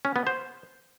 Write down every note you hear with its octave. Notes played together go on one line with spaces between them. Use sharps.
C#4
B3
C5